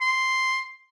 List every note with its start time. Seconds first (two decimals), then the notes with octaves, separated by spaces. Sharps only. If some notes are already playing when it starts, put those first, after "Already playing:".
0.01 C6